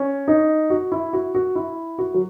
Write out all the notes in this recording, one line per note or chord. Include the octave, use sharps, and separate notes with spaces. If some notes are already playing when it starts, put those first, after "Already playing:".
Already playing: C#4
D#4
F#4
E4
F#4
F#4
E4
F#4
F#3